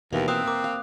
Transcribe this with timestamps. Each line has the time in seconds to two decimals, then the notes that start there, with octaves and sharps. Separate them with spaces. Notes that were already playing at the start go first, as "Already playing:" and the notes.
0.13 D#2 B2 E3 A#3
0.28 C4 E5 F5 D#6 F#6
0.48 A#4 D6
0.64 F5